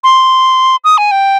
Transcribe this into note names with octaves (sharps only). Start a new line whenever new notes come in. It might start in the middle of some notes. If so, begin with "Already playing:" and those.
C6
D#6
G#5
G5